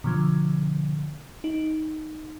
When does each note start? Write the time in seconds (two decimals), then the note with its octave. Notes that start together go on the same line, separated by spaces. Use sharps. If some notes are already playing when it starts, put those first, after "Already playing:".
0.04 B2 D3 F3
1.44 D#4